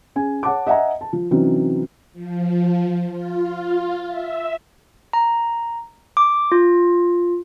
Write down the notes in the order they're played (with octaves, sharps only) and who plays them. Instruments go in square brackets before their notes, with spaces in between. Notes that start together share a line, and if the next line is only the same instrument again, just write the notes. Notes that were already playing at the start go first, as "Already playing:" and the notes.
[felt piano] C#4 G#4 G#5
C#5 F#5 A5 D6
D#5 E5 F#5 G#5 A#5
A5
F3
C3 E3 F#3 C4 C#4 D#4
[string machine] F3
F4
E5
[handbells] A#5
D6
F4